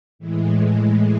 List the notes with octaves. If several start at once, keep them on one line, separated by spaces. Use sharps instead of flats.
A2 E3 G#3